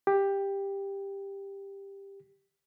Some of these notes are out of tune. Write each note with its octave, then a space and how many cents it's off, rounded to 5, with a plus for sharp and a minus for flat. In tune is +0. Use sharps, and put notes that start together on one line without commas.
G4 +10